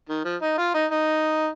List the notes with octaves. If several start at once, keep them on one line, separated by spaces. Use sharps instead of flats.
D#3
F3
D#4
F4
D#4
D#4